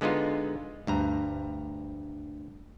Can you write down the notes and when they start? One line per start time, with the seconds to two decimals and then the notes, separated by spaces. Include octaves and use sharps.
0.01 D3 G#3 B3 D#4 F4
0.87 D2 G2 A#5